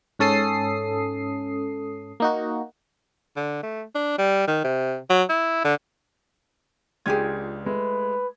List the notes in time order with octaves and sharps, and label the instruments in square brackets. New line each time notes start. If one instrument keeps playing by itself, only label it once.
[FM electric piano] G#2 C#4 A4 D#6 C7
A#3 D#4 F#4
[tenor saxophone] D3
A3
D4
G3
D#3
C3
F#3
E4
D3
[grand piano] C#2 D4 G#6 [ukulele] F4 G4 G#4
[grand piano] G#3 A3 [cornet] B4